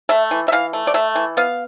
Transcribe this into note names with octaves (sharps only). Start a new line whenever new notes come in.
A3 E5
E3
E5
E3 F5
A3
D5
A3 E5
E3
B3 F5